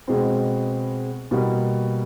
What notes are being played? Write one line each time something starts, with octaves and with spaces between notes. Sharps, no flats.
B2 G#3 C4
B2 G3 A#3